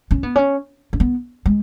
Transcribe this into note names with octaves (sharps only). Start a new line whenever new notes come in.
C#4
B3
C#4
C#4
B3
G#3